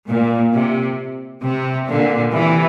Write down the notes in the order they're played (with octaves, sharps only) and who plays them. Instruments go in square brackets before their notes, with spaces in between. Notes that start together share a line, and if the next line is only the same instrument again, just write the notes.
[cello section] A#2
C3
C3
A#2 D3
C3 E3